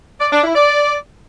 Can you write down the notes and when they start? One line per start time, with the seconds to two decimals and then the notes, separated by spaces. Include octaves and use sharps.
0.21 D5
0.32 D4
0.44 E4
0.56 D5